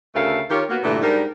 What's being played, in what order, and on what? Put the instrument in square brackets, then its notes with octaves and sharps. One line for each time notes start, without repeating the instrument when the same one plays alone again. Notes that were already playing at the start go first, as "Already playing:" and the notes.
[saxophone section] D2 C#3 A3 A4 A#4 F5
D#3 F4 G4 A#4 C#5
A#3 B3 F#4
G2 A#2 D3 E3 G3 A3
G#2 G3 D4 A#4